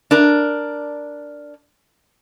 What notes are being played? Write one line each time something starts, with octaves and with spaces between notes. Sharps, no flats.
D4 A#4